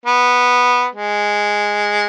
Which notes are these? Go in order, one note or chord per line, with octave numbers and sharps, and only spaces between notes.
B3
G#3